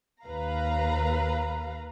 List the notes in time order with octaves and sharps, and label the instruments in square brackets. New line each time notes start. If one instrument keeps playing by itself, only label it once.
[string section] D#2 B4 F5 A#5